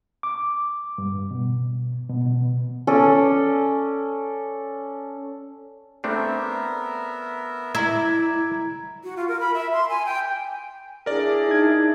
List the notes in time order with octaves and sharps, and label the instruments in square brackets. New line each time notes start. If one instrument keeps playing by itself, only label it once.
[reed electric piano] D6
G2
B2
B2
B2
[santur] C#4 A4 D5 D#6
[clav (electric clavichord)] A3 C4 D4 [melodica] B3 A#4 E5
[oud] E4 [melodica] D5 E5 [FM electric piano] A#5 G#6
[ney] F#4
F4
A#4
B5
E5
C6
G#5
G5
[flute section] D4 E4 G#4 [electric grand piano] A#4 D5
[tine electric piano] D#4 G#6